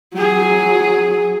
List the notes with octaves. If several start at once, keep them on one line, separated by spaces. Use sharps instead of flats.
F#3 G#4